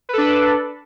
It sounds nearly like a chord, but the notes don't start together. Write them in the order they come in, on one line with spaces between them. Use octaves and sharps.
B4 A4 D4